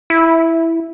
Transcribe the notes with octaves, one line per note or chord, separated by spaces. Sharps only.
E4